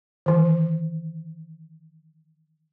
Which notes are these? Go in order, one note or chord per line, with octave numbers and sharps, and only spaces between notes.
D#3 E3